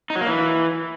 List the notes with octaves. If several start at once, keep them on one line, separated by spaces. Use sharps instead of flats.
D#4
F#3
A#3
E3